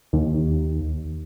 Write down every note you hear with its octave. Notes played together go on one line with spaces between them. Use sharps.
D#2